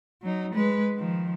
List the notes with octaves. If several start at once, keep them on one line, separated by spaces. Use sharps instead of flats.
F#3 D#4
G#3 B4
D#3 F3